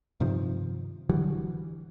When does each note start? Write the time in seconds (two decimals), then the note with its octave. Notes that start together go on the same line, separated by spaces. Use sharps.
0.20 G2 C3 D#3 F3
1.09 D3 E3 F#3 G3